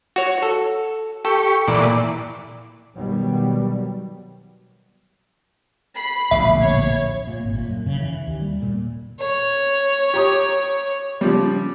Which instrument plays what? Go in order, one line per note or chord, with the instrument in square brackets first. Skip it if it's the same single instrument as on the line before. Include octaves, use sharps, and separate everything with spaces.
[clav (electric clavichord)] F#4 C#5
A4
[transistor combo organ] G4 C#6 [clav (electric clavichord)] A4
[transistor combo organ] A#2 E3 D5
[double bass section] B2 D#3 F#3 G3
[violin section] B5 C7
[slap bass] D1 A#1 B2 [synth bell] E5
[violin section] C#5 G#6
[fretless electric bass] A#2
G#1
A#2
F#2
C#3
E3
D#2
G3
A#2
[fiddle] C#5
[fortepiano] G4 A#5 D#6
C#3 F3 G3